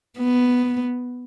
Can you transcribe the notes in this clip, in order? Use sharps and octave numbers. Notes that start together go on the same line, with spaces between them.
B3